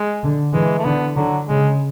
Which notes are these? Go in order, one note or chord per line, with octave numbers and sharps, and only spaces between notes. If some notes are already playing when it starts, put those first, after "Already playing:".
Already playing: G#3
D3
E3 G#3
A3
D3 B3
D3 F#3
C#3 G#3